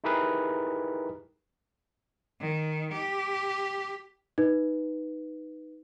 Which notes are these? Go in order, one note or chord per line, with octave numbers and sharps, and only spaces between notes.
D#4 E4 G4 G#4 A#4 B4
D#3
G4
D#4 B4